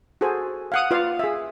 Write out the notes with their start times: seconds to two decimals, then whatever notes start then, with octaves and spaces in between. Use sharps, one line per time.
0.21 F#4 G#4 A4 C5 G#5
0.72 F5 F#5 D#6
0.91 F4 B4 D5 F5
1.19 G#4 E5